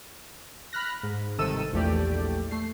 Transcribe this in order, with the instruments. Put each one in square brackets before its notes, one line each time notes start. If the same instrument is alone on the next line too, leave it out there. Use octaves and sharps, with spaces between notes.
[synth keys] B5 F6 F#6 A#6
G#2
G1 C3 D#3 A4 E6 D#7
A#1 E2 A3 G4 D5
A3 C7